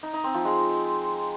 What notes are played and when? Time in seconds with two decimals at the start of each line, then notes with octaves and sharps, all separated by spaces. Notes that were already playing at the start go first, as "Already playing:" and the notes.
0.03 D#4
0.13 D#4
0.24 C4
0.34 F3
0.45 G#3